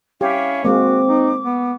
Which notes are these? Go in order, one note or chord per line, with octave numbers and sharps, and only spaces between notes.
C#4 E4 G4 F5
G#3 A#3 C4 F#4 D6
D#4
B3